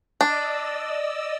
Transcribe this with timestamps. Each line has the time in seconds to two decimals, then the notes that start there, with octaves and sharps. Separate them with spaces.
0.21 D4 D5 D#5 E6